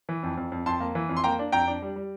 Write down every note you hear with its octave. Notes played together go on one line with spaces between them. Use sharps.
E3
F2
F2
F2
F2 A5 C6
A#3
E3
F2
C6
A#3 G5 A#5
D4
F2 G5 A#5
D4
G3
G3